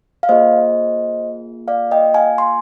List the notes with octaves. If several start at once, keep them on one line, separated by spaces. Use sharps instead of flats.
F5
A#3 F4 G#4 C5 D#5
D5 F5
D#5 G5
F5 G#5
G#5 C6